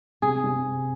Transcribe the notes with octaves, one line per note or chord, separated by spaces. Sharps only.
C3 G#4
C3